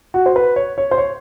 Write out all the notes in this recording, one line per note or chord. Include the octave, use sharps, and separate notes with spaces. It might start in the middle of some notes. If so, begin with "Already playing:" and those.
F#4
C5
B4
C#5
C#5
C5
C#5